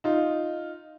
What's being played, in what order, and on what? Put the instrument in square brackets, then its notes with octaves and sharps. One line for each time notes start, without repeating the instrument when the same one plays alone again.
[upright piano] D#4 F4